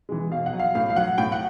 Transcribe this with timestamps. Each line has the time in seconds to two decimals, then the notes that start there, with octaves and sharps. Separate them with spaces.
0.09 E3 G#3
0.31 B2 F5
0.46 F#5
0.53 F#3
0.59 F5
0.75 A2 F5
0.90 F5
0.96 F#3 F#5
1.18 A2 G5
1.32 F#5